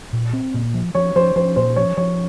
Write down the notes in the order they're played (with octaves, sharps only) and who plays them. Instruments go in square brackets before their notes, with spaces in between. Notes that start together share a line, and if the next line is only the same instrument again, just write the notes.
[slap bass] A#2
C4
A#2
F3
[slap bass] F3 [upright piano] C#5
[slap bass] F3 [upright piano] C5
[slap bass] F3 [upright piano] C5
[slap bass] A#2 [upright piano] C5
[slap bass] F3 [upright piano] C#5
[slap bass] F3 [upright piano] C#5